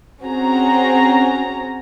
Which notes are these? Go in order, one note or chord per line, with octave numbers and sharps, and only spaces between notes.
C4 C#4 F#4 G#4 A#5